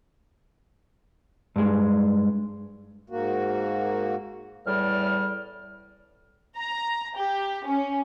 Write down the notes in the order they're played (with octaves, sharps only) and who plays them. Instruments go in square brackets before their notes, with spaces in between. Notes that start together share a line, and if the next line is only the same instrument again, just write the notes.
[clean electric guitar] G2 G#3
[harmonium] G#2 A#3 F#4
[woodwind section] E2 A2 G3 F6
[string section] A#5
G4
C#4